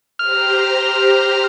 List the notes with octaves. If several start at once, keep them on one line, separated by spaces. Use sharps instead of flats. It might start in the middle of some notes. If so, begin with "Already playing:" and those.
G4 C5 A#5 F6